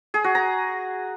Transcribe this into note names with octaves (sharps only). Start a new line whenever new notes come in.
G#4
F#4
A#5